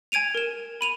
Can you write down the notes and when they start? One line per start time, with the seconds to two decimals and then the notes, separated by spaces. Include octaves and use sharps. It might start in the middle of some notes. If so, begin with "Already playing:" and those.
0.12 G#5 G#6 D7 D#7 F7
0.35 A#4 E7
0.81 B5 D#7 F7